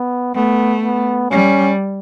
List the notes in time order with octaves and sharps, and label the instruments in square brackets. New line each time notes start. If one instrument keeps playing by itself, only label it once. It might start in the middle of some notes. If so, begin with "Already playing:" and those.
Already playing: [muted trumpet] B3
[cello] A3 [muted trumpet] B3
[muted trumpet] B3
[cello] G3 [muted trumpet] C#4